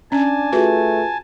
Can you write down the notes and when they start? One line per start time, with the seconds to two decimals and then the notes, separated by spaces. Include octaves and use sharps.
0.12 C#4 D4 G#5 A5
0.52 A3 F4 F#4 G#4 B4